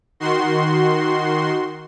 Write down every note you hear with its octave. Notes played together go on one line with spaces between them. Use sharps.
D#3 F#4 C6